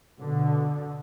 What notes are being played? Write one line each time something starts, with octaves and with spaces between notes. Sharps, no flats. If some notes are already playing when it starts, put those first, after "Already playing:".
B2 D3